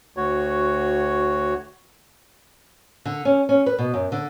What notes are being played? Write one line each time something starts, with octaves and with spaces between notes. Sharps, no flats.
D2 F#4 C#5
D3
C#4
C#4
B4
B2
F#2
D3